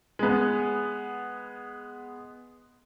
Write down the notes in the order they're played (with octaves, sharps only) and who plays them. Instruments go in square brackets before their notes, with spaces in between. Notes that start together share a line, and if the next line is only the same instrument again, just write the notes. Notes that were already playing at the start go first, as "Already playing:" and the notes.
[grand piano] G#3 B3